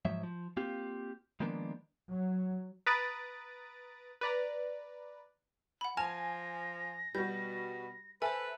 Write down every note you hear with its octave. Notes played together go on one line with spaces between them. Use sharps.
G#2 F3 F#3 E5
F3
A#3 C4 F4 G4
D#3 F3 G#3 A#3 B3 D4
F#3
B4 A#5 D#6 A6 D7
B4 D5 A#5
F#5 B5
F3 G#5 A5 F6 A#6 F7
B2 G3 F#4 G6
A4 B4 C5 E5 G#5